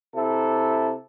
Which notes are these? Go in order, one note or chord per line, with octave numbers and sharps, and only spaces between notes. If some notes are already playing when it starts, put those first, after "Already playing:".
C3 E4 A4